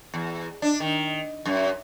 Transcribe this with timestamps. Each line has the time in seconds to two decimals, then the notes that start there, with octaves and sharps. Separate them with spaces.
0.14 E2
0.62 D4
0.80 D#3
1.46 F#2